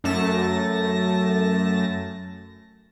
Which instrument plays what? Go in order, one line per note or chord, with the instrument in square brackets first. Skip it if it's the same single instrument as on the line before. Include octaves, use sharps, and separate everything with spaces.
[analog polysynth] F#2 A3 A5 A#6